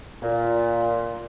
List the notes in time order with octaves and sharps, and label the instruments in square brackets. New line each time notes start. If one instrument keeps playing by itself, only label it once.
[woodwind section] A#2